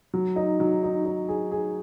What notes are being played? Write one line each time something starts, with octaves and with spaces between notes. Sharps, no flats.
F#3
D#4
F#3
D#4
D#4
G#4
G#4